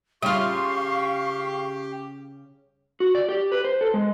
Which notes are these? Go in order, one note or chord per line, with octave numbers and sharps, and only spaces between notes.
C#3 G3 F4 G4 F5 C#6
F#4
D5
G4
B4
C5
A4
G#3